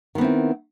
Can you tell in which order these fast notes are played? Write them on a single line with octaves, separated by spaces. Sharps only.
D#3 B3 C4 E4